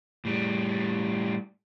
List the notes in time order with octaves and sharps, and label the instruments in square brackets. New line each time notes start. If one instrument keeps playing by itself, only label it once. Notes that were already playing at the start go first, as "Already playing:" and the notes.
[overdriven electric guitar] A2 G3